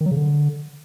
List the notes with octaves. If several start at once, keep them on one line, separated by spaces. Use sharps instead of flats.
D#3
F#3
C#3
D3